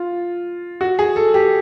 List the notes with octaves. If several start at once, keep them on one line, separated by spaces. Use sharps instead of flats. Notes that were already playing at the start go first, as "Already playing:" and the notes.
Already playing: F4
F#4
G#4
A4
G4